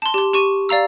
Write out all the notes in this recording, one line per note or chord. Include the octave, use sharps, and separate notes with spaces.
A5 C6
G4 C6
G4 C#6 D#7
D5 F5 A#5 E6